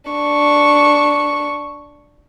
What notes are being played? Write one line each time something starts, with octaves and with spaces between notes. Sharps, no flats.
D4 C#6